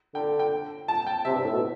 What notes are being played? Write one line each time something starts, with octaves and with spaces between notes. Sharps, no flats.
D3 G5
G5
A5
G5
C3 E5
G2
A2
B2